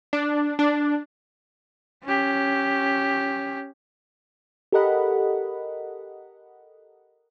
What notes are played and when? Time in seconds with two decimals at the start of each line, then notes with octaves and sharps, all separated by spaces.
0.13 D4
0.59 D4
2.04 C#4 G4
4.72 G4 A4 A#4 D#5 F#5 B5